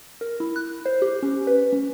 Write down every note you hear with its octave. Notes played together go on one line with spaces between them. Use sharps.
A#4
E4
F#6
C5
G4
C#4
B4
C#4